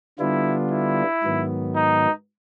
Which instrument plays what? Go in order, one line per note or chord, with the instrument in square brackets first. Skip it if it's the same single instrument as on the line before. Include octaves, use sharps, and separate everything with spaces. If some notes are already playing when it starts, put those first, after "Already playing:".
[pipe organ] D3 G3 B3 D4 F4 [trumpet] E4
[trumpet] E4
[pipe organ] G#2 D#3 F#3 B3
[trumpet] D#4